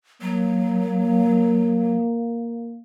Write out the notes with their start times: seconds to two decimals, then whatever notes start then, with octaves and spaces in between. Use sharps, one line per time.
0.22 F#3 A#3